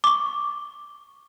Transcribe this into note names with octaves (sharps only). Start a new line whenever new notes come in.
C#6 D6